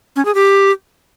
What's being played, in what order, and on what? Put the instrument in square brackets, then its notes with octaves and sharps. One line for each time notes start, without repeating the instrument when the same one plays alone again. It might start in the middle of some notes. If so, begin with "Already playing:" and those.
[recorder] C#4
G#4
G4